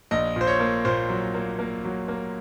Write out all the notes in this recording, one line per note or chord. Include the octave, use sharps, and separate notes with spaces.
A#1 D#5
A#2 C5
C#5
A#3
A#2 C5
F#3
A#3
A#3
F#3
A#3